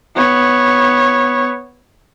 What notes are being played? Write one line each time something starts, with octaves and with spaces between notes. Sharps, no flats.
B3 C#5